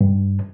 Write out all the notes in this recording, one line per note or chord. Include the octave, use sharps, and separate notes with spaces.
G2